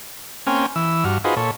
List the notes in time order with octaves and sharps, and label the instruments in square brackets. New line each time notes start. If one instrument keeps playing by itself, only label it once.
[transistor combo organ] A#3 C4 C#4 G5 G#5 F6
E3 E6
G2 F#4 F6
D#4 F4 F#4 G#4 B4 C5
A#2 A4 C#5